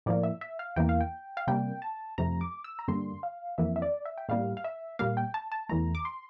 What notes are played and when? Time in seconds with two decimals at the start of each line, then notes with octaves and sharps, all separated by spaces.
0.06 A2 F3 A#3 D5
0.23 E5
0.41 E5
0.59 F5
0.76 E2 E3 A#3 G5
0.89 F5
1.01 G5
1.37 F5
1.47 C3 G3 A#3 G5
1.82 A5
2.18 F2 C3 F3 A3 A#5
2.41 D6
2.64 E6
2.79 A#5
2.88 G2 D3 G3 A#3 C6
3.23 F5
3.58 F2 E3 A#3 E5
3.76 E5
3.82 D5
4.05 E5
4.18 G5
4.29 A2 G3 A#3 F5
4.57 F5
4.64 E5
4.99 A#2 G3 A#3 F5
5.17 G5
5.34 A5
5.52 A5
5.69 E2 E3 A3 A#5
5.95 D6
6.05 C6